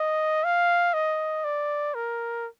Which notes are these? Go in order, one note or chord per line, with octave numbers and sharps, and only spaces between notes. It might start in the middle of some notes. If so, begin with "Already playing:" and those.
Already playing: D#5
F5
D#5
D5
A#4